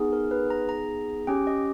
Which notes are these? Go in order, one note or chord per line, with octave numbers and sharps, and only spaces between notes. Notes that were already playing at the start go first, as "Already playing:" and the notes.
Already playing: B3 D#4 G#4
A#4
B4
A#5
A#5
C#4 G4 G5
D#5